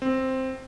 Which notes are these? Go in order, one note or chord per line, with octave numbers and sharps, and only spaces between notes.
C4